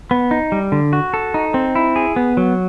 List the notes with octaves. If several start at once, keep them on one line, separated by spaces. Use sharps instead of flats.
B3
D#4
G3
D3
F#4
A4
D#4
C4
E4
G#4
B3
F#3